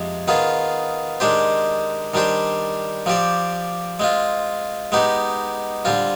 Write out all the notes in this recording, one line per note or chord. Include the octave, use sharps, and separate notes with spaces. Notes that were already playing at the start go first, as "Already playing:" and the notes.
Already playing: F2 C3 G#3
D#3 B3 F4 G#4
D#3 G#3 D4 G4 C5
D#3 G3 D4 G4 C5
F3 C4 G4 D5
G#3 C4 F4
G#3 B3 D#4 G4
D3 G3 C4 F4